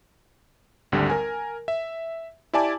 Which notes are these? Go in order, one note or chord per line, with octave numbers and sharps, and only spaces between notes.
G#1 D2 D3 G3
A#4 G#5
E5
E4 G4 D5 G#5 A5 D6